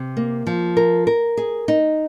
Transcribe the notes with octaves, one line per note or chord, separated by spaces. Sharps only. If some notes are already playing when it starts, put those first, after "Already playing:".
Already playing: C3
A#3
F3
A#4
A#4
G#4
D#4